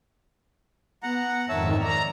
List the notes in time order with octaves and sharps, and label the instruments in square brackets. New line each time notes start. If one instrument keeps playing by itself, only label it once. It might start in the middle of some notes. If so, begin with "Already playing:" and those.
[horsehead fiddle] B3 [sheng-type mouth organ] F#5 A#5
[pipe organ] F2 G#2 D#3 [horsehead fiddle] A#4 [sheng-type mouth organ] C#5 E5 A5
[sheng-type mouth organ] D5 [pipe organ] A#5